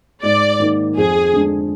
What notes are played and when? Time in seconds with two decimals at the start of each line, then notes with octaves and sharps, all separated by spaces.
0.23 G#2 D5
0.60 D#3 A#3 D#4
0.96 F2 G#4
1.33 D3 G#3 D4